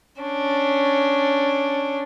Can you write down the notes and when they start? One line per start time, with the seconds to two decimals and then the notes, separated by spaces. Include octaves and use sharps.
0.21 C#4 D4